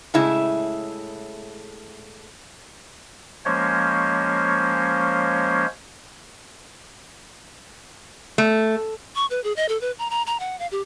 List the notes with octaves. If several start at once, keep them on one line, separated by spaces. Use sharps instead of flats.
A2 C#3 G#3 E4
F3 G#3 A#3 C#4 C5 C#5
A3
C#6
B4
G#4
D#5
A4
B4
A#5
A#5
A#5
F#5
F5
G4